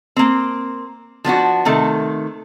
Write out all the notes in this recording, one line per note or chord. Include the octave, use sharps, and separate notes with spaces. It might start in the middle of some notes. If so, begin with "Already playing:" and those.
A#3 C4
F3 B3 D4 F#4
C3 D#3 A3